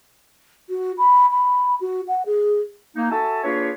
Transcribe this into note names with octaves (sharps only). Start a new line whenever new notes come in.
F#4
B5
B5
F#4
F#5
G#4
A#3 D#4
F#4 A4 E5 G#5 A5
A#3 D4 F4 G#4 B4 C#5